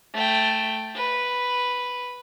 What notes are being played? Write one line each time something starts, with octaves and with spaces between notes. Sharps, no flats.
A3 G5
B4